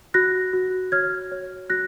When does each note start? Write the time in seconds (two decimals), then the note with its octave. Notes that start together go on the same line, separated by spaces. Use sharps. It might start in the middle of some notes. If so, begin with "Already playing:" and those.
0.14 F#4 F#6 A#6
0.53 F#4
0.92 C#5 F6 G#6
1.32 C#5
1.70 F#4 F#6 A#6